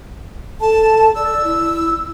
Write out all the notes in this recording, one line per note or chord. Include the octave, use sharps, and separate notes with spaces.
A4 A5
D5 E6
E4